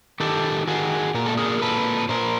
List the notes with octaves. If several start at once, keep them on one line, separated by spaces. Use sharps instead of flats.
D#3 G4 A4
D#3 F#4 G#4
A#2 A#4
A4
G#4 A#4
A#2 A4 B4
A#2 A#4 C5